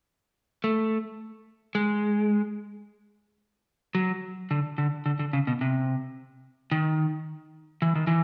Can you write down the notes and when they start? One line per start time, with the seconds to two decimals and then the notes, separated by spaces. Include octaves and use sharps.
0.64 A3
1.75 G#3
3.95 F#3
4.51 D3
4.78 D3
5.06 D3
5.19 D3
5.33 C#3
5.47 B2
5.61 C3
6.72 D#3
7.82 E3
7.95 D#3
8.07 E3